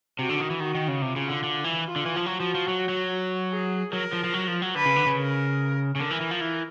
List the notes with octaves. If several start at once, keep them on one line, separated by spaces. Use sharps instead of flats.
C3 F#4
D3
D#3
E3
D#3 F#4
D#3
C#3
C3 F4
C#3
D3
D3
E3
F4
D3
E3
F3
F#3 F#4
F3
F3
F#3
F#3
G#4
F#3 A#4
F3
F3
F#3
F3
F#3
D3 B4
C#3
D3
C#3
A#4
C#3
D3 A#4
E3
E3
F3
E3